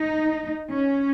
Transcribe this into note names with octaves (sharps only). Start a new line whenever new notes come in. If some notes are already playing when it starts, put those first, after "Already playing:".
Already playing: D#4
C#4